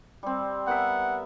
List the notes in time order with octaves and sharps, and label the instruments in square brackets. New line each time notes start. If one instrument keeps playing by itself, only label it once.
[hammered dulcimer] G3 C4
[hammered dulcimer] B3 A#4 E5 [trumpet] F#5